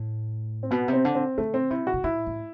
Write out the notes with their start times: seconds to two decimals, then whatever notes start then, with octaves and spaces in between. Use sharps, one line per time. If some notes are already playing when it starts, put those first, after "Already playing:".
Already playing: A2
0.63 C4
0.71 B2 B3
0.88 C3
0.93 C4
1.05 D3
1.15 C4
1.38 D3 A3
1.54 C4
1.71 C3 E4
1.87 F#4
1.94 B2
2.04 A2 E4
2.27 F#2